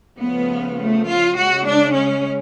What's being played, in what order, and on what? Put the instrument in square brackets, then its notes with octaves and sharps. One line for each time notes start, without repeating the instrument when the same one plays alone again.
[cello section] C#3 F3 A3 B3
A3
F4
C#3 G#3 F#4
D4
C#4